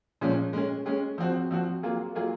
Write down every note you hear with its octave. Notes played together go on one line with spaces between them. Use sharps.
A#2 F3 G#3 C#4
G#3 C#4 G#4
G#3 C#4 G#4
F3 C4 F#4
F3 C4 F#4
F#3 A#3 F4 G#4
F#3 A#3 F4 G#4